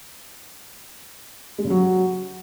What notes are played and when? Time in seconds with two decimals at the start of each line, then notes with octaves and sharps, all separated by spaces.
1.58 G#3
1.64 C#3
1.70 F#3